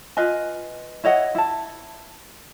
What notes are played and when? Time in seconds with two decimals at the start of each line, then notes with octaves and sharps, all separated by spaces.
0.17 F4 B4 D#5 G#5
1.04 E4 C#5 D#5 F#5
1.35 E4 A5